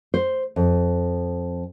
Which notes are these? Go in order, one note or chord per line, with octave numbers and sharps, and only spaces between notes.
C5
F2